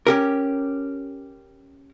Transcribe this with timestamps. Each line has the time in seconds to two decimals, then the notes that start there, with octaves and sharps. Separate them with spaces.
0.07 C#4 G4 A#4